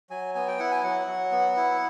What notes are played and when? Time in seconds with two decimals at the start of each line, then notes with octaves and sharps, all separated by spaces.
0.10 F#3 G#5
0.35 B3 G#5
0.48 G5
0.59 E4 F#5
0.71 G#5
0.84 F#3 F#5
1.07 F#3
1.32 B3
1.56 E4